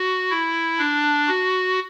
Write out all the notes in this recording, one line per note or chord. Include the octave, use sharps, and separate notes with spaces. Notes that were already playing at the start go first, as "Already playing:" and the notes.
Already playing: F#4
E4
D4
F#4